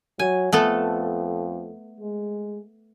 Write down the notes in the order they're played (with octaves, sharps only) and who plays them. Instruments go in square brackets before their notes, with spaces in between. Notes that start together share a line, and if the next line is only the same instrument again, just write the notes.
[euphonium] F#3 [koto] G#5
[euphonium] F2 [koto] A3 B3 A4
[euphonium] G#3